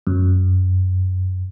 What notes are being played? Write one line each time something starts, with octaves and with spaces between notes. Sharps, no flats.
F#2